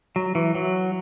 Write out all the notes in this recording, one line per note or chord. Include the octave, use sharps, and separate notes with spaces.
F#3
E3
F#3